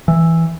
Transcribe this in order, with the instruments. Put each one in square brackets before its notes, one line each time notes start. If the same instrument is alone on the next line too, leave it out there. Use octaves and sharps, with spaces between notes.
[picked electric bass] E3